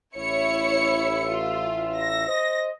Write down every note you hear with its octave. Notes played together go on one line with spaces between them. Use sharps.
A1 E4 C#5 E5 C#7
F4
A#6
C5 D#5